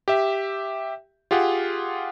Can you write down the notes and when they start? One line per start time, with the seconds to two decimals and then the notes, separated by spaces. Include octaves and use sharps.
0.08 G4 E5
1.31 F4 G4 G#4 F#5